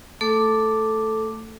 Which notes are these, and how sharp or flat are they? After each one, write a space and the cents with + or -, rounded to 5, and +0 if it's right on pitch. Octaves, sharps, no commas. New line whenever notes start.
A3 +10 A4 -5 D6 +0